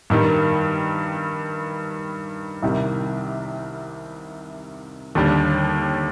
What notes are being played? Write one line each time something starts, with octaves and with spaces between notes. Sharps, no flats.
G2 D#3 G3
C2 C3 D#3 G3
D#2 D3 G3 D4